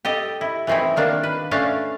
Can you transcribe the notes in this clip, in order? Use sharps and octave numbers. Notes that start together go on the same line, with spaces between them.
G4 A4 D#5
E4
E3 A3 C4 D#4 E4
D#3 A#3 D4
B4
A3 C#4 D4 A4 F5 A5